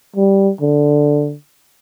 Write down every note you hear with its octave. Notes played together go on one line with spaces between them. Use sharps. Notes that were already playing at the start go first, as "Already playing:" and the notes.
G3
D3